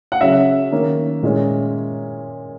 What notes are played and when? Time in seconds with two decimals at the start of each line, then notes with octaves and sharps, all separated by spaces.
0.12 F#5
0.21 C#3 F#3 C#4 E5
0.72 D#3 A#3 C#4
1.23 A#2 G#3 C#4